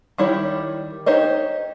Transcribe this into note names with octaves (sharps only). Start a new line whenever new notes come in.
D#3 G3 E4 G4 C#5
D#4 G4 C5 C#5 D#5